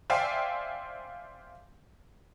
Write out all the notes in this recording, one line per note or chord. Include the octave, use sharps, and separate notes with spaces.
C5 D5 E5 F5 G5 G#5